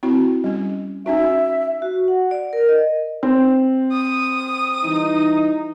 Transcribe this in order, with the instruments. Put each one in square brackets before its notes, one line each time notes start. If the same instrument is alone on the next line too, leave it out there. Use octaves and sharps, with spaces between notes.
[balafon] C4 E4 F#4
G3 C#4
[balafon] C#4 D#4 F#4 [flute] E5
[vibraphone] F#4
F#5
D5
A#4
D#5
[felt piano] C4
[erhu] D#6
[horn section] E3 G3 D#4